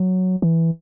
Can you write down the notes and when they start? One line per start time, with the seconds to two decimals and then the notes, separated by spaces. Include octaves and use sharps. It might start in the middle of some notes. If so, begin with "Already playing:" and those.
Already playing: F#3
0.42 E3